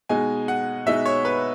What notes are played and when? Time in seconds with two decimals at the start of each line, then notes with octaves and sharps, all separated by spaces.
0.09 B2 G#3 D#4 G#5
0.48 F#5
0.86 B2 G#3 D#4 E5
1.06 C#5
1.25 B4